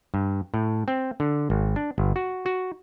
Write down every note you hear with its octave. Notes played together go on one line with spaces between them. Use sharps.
G2
A2
C4
D3
G#1
D4
G1
F#4
F#4